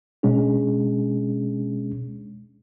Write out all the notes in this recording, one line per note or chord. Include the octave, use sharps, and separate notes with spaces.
B2 G#3 C#4 D4 G#4